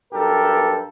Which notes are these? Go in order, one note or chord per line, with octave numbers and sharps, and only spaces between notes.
B1 G2 G4 A4 A#4